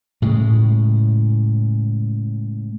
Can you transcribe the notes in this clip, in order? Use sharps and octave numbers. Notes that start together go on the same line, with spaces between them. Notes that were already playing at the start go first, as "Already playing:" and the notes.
A2 C#3 G#3